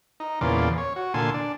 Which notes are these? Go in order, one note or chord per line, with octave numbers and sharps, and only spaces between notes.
D#4
E2 A#2 C#3 F4 D5
C#5
F#4
A#2 D3 G#5 A5 C6
D4